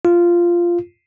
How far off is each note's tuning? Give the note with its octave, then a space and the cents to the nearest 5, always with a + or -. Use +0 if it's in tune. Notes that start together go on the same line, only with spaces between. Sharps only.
F4 -10